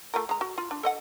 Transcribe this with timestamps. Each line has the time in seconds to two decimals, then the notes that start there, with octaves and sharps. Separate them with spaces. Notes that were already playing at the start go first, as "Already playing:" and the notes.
0.14 A3 F4 A#4
0.29 G#3 A#5
0.41 F#4
0.58 F4
0.71 D4
0.83 A4 D#5 F#5